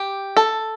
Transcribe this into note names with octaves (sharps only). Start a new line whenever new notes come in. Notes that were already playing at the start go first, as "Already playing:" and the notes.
Already playing: G4
A4